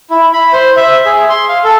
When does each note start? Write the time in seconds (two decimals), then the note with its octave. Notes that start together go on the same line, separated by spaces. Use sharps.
0.10 E4
0.33 B5
0.53 C5
0.77 E5
1.05 G#4
1.29 C6
1.49 F5
1.64 A4